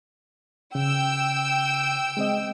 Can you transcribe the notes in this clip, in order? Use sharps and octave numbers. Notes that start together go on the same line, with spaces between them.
C#3 G5 E6
G#3 C4 D#5